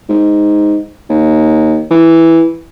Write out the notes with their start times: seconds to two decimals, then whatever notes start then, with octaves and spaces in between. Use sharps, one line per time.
0.09 G#2
1.09 D#2
1.91 E3